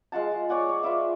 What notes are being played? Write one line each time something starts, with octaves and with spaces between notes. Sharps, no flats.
G#3 F4 F#5 A5
G#3
C#5 D5 F#5 G#5
C#5
F4 B4 D5 E5